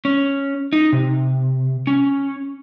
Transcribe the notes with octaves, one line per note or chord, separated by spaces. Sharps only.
C#4
D#4
C3
C#4